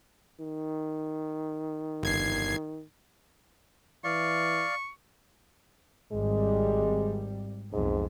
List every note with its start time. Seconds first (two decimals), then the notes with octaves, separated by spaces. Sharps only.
0.40 D#3
2.03 G1 G#6 C7
4.04 E3 D5 F5 C#6
6.12 G#1 G3 G#3
7.73 B1 F2 G#2